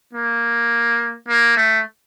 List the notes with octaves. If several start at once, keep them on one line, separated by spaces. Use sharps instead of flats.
A#3
A#3
A3